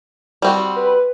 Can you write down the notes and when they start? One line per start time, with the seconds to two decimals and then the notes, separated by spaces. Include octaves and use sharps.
0.42 G3 C4 F#4
0.76 B4